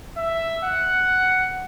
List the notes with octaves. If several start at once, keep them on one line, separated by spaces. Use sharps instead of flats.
E5
F#5